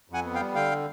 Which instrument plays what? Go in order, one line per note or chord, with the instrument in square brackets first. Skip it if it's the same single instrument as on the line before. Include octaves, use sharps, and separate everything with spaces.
[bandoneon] F2 F#5 G#5
B3
F5 G5
G3
D3 F5 G5